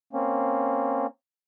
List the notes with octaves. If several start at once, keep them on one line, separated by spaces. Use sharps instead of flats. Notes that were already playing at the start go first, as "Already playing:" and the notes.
A#3 C4 C#4